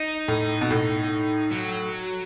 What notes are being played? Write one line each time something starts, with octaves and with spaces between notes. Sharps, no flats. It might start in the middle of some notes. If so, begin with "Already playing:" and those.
Already playing: D#4
A2
B2
A2
F#3